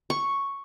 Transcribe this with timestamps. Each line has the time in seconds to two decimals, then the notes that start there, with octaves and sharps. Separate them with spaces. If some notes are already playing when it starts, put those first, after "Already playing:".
0.10 C#6